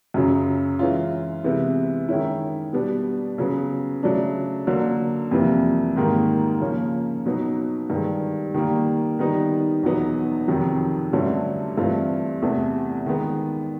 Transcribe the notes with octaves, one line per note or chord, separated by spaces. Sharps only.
F#2 C#3 F#3
E3 G#3 C#4 F4
C3 E3 G#3 B3
D#3 G#3 C#4 E4
B2 G3 B3 D4
C#3 F#3 B3
C#3 F#3 A3 D4
D3 F#3 A#3
F2 C3 E3 G3 A#3
G#2 D#3 G3 A#3
C#3 F3 A#3 C#4
B2 F#3 B3 D#4
G2 D#3 G#3
D#3 G3 A#3
D#3 G3 B3 D#4
E2 B2 F#3 B3 D#4
F2 C3 D#3 F#3
G2 D3 F#3 A3 C#4
G2 E3 A3 C4 F4
E2 C3 E3 A3
D#3 G#3 B3